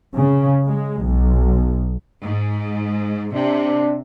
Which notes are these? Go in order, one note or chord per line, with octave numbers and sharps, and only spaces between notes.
C#3
G#3
B1
G#2
C3 D4